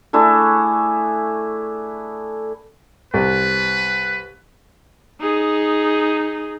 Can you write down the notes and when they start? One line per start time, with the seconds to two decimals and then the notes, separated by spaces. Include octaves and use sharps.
0.13 A3 D4 E4 G#4
3.14 C2 B4
5.21 D#4 G#4